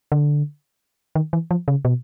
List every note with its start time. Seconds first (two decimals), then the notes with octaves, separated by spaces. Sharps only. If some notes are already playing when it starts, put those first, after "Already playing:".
0.12 D3
1.15 D#3
1.33 E3
1.51 F3
1.68 C#3
1.85 B2